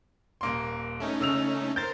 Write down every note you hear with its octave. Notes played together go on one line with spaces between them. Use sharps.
D#1 A#3 C6
A3 C#4 D#4
C#3 E6 F7
A#4 C5 G6 A6